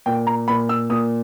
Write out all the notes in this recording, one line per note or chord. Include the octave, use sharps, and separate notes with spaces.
A#2 G5
A#5
A#2 B5
E6
A#2 D#6